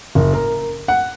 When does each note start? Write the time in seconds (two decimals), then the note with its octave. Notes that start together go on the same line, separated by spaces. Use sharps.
0.15 F#1
0.34 A#4
0.88 F#5